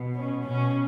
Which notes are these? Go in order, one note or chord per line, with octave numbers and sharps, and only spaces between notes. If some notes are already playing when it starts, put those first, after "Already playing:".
Already playing: B2
C#4
B2 C#4